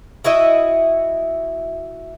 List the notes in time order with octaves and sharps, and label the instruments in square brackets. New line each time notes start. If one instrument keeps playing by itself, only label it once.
[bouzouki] E4 F#4 D#5 E5